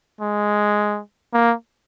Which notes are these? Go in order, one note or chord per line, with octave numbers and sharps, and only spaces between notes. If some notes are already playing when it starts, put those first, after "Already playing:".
G#3
A#3